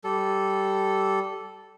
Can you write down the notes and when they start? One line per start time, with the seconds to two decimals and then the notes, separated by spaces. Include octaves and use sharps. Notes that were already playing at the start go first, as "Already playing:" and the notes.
0.04 G3 A4